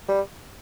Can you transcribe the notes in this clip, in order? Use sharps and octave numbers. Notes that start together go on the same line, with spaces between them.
G3